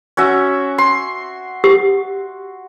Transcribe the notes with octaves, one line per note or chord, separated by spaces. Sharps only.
C#4 F#4 E5
C6
G4